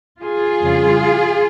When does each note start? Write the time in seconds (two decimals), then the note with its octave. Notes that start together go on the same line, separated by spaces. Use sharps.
0.22 F4 G#4
0.61 F2 C#3 G3